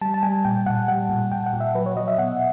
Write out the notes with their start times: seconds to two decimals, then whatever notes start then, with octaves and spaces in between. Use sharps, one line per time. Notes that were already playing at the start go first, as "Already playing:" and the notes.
0.01 G3 A5
0.14 A5
0.23 G3 G#5
0.45 A#2 G5
0.66 A#2 F#5
0.88 G3 F#5
1.09 A#2
1.32 A#2 G5
1.46 F#5
1.53 A#2
1.60 E5
1.75 F#3 B4
1.86 C#5
1.96 F#3 D#5
2.08 E5
2.18 B2 F#5